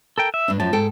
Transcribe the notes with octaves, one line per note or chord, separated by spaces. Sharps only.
A4 A#4 G5
E5
G2 D4
F#2 F3 A5
G#2 A4 G5